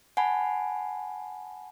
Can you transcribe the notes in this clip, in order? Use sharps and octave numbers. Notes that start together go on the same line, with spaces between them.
F#5 G#5 A5 B5